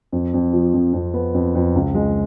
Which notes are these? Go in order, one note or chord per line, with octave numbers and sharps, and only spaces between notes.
F2
F2
F3
F2
F2
B3
F2
F2
C#2
G#3